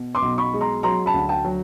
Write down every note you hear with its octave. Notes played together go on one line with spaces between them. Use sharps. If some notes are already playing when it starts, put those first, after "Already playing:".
Already playing: B2
C6 D6
B1
B5 C#6
G#3
A#5 C6
F#3 A#5 C6
A5 B5
D2
G5 A5
F#3